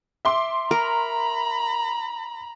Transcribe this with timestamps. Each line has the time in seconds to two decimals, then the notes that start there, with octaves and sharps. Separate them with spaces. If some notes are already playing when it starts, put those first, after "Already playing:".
0.25 E5 C6 D6
0.71 A#4 A#5 B5